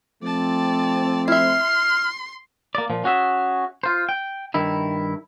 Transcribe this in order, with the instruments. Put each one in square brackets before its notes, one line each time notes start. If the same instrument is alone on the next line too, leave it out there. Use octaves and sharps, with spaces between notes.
[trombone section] F3 A3 C4 [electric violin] D5 A5
[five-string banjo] E4 E5 [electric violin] C6 C7 [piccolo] F6
[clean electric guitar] A#3 D5
A#2 F3
C#4 F#4 G#4 E5
F4 C5
G5
G2 D#3 E4